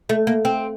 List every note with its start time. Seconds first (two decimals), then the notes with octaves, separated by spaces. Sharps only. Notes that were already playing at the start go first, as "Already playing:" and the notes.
0.09 A3
0.27 A#3
0.45 C4